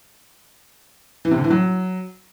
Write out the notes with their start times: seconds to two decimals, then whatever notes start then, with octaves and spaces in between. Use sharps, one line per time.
1.25 E3
1.31 C3
1.38 D3
1.44 E3
1.50 F#3